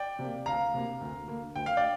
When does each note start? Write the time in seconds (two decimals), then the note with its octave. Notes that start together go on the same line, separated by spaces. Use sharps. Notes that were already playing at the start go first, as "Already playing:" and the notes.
Already playing: D5 G5
0.19 C3 A#3
0.46 D2 F5 A#5
0.74 C3 A#3
1.01 D2
1.28 D3 A#3
1.56 D2 G5
1.66 F5
1.77 D5 G5